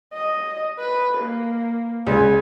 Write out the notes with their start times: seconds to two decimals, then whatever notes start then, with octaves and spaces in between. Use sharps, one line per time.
0.13 D#5
0.79 B4
1.17 A#3
2.07 C#2 G#5